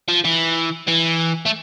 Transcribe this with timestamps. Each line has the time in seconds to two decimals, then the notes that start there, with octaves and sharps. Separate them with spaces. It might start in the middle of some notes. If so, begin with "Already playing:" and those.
0.09 F3
0.25 E3
0.88 E3
1.46 A3